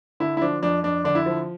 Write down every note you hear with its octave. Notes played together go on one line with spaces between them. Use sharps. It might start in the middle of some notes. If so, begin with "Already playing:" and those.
D3 E4
E4
F3 D4
F2 D4
F2 D4
D3 D4
E4
F3